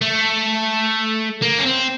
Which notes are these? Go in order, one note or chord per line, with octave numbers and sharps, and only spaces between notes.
A3
A#3
C#4
C4